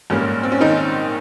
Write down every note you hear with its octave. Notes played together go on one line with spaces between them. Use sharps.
A#1 G#2 G3 A#3 C#4
C4
C#4
D#3 D#4